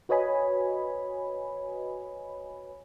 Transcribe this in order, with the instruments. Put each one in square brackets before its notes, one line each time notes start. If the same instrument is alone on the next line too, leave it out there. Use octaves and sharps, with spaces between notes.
[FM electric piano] F#4 B4 C#5 D#5 G#5 B5